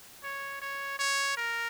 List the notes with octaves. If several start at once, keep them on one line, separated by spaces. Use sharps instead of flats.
C#5
C#5
C#5
A#4